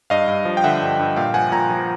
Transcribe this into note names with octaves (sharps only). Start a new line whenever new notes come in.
G2 D#5 F5
G2
F3
G5
D3 E5 F#5
G2
G2
A#2 F5 G5
F3 F#5 G#5
A#2 G#5 A#5
F3